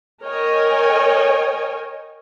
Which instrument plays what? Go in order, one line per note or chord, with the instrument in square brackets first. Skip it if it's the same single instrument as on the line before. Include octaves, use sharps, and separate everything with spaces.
[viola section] A#4 C#5 D#5 G5 G#5